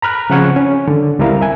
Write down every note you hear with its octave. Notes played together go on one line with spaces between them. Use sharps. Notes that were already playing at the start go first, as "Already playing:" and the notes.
A#5 B5 F6 F#6
C#3 F3 C4 F#5 C#6 G#6
C#4
D3
C#2 G3 C4 E4 A#4 F5
E5 G#5